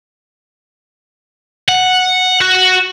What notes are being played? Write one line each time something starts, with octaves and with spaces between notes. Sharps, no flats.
F#5
F#4